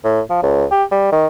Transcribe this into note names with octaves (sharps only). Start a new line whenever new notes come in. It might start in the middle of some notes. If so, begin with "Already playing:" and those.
A2
F3
C#2
G4
G3
D#3